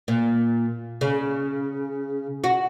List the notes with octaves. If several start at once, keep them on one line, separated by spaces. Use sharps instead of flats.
A#2
C#3
F#4